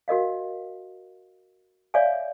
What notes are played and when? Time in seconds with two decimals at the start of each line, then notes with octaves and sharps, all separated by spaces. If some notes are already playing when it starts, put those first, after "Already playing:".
0.08 F#4 A#4 D#5 F5
1.94 C#5 D5 E5 F5 G#5